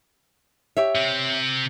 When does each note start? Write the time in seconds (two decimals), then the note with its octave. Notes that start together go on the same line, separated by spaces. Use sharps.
0.77 G4 C#5 E5
0.95 C3 C4